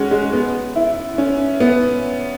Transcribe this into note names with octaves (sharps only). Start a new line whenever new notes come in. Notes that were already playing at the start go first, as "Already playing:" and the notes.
Already playing: G#3 C#4 F#4
G#3
B3
E4
C#4
B3